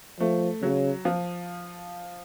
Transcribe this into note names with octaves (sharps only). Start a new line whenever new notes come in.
F3 A3
C#3 F#3
F3